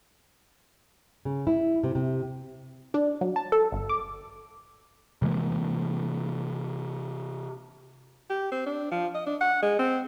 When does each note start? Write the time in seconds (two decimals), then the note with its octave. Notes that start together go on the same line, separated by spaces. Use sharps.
1.25 C#3
1.47 E4
1.83 C3
1.95 C3
2.94 D4
3.21 F#3
3.36 A5
3.52 A4
3.72 G1
3.89 D6
5.22 C3 E3 G#3 A#3
8.30 G4
8.52 C4
8.66 D4
8.92 F3
9.15 D#5
9.26 D4
9.41 F#5
9.62 G#3
9.79 C4